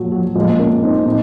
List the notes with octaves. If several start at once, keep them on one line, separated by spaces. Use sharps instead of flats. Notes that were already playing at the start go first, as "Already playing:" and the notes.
Already playing: A#2 F3 F#3
F#3
A#2 F3 G#3
A#3 C#4
C4 D#4
A#2 C4 D#4